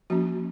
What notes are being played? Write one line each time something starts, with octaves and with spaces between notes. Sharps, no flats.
F3 A#3 C#4 F#4